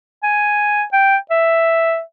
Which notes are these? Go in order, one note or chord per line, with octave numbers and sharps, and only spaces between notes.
G#5
G5
E5